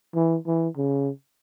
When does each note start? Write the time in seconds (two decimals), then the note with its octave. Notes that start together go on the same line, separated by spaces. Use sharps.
0.15 E3
0.47 E3
0.77 C#3